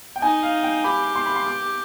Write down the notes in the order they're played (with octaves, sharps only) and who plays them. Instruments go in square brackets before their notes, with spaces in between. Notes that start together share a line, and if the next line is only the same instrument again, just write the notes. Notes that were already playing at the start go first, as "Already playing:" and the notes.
[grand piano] G5
[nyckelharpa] D#4 [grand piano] G#5
[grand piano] F5
G5
[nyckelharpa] G4 [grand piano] B5
[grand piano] C6
B5
C6
D6